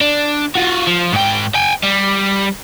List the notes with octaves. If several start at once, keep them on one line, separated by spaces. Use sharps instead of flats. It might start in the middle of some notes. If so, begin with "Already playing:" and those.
D4
F4 F#4
F3
G#2 G5
G5 G#5
G3